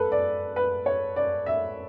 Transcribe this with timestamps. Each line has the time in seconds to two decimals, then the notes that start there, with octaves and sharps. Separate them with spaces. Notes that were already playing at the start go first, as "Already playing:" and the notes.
Already playing: A4 B4
0.12 D5
0.56 B4
0.86 C#5
1.16 D5
1.46 E5